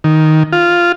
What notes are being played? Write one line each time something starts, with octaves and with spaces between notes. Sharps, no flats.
D#3
F4